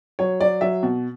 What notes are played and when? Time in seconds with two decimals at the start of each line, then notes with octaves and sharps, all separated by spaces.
0.19 F#3 C#5
0.40 F#3 D5
0.61 F#3 E5
0.83 B2